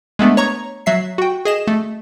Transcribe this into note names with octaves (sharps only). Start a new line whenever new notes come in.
G#3 A3 B3 D4
C#5 A#5 C#6
F#3 E5 C7
F#4 G5
G#4 D#5 E7
A3